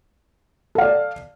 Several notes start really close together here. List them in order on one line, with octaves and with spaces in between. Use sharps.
A4 F5 D5